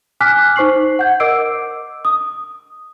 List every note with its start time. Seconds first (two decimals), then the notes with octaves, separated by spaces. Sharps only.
0.21 G#5 D6 F6 F#6 B6
0.56 D#4 C5 C#6 C7 F#7
0.99 F#5 G6 G#6
1.20 A#4 D#5 D6 E6 C7 D7
2.05 D#6